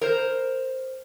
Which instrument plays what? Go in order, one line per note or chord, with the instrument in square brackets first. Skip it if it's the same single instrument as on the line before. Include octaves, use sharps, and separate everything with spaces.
[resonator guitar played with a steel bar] A#4 C5